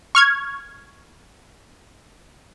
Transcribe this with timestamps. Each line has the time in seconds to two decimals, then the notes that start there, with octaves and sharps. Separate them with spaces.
0.15 C#6 F6 G#6